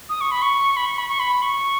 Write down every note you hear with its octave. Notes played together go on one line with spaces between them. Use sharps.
D#6
C#6
B5
C#6
B5
C#6
B5
C#6
B5
C#6